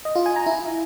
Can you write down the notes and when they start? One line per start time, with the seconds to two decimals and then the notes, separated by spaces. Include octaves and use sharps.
0.05 D#5
0.15 F4
0.26 G#5
0.36 A#5
0.46 E4